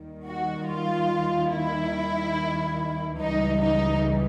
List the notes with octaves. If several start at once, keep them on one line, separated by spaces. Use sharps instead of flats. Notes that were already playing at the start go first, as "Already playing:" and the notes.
Already playing: D#2 D#3 G3
F#4
F4
E4
C#2 C#3 E3 G3 D#4
D#4